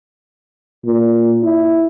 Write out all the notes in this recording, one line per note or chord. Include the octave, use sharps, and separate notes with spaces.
A#2
E4